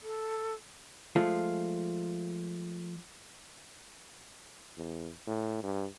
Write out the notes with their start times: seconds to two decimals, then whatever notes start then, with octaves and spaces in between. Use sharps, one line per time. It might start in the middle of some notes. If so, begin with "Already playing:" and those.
0.03 A4
1.16 F3 G#3 A3 F4
4.77 E2
5.27 A2
5.63 G2